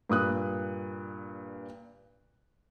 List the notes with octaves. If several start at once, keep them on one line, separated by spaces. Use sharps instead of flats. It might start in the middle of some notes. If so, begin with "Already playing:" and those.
G2 A#2 D#6 F#6